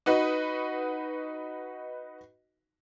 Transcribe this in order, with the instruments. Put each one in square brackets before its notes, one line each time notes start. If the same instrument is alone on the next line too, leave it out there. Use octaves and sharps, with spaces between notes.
[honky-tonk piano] D#4 F#4 B4 D#5